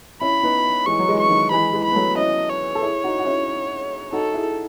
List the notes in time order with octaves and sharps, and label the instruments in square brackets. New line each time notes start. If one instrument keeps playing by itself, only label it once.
[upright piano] C#4 E4 [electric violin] B5
[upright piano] B3 D#4
[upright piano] E3 G#3 [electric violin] C#6
[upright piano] F#3
E3 G#3
[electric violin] C#6
[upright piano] D#3 F#3
[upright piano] E3 G#3 [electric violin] B5
[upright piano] E3 G#3
[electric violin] B5
[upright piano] B3
F#3 A3
[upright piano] C#4 E4 [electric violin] D#5
[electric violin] C#5
[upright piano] A4
E4 G#4
D#4 F#4
F#4
C#4 E4
[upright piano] D#4 F#4 [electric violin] A4
[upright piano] E4 G#4